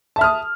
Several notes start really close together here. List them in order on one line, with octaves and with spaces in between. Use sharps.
A5 E5 F6 D#6